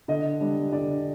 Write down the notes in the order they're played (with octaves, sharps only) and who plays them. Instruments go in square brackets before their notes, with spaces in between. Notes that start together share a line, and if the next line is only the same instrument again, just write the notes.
[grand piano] D3 D#5
G3 D4
D3 D5